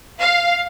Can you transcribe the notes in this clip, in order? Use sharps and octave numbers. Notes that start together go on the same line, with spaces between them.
F5